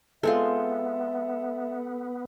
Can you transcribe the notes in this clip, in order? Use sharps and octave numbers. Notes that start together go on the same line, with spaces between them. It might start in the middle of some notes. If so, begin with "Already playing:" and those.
G#3 B3 C4 F4 A4 E5